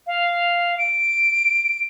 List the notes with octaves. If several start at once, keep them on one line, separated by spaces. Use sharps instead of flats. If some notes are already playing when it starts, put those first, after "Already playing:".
F5
D7